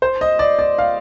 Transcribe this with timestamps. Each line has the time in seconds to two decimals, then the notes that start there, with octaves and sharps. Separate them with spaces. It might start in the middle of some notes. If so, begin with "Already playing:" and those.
0.02 C5
0.21 D#5
0.39 D5
0.59 D5
0.78 F5